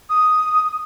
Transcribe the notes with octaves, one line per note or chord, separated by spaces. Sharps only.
D#6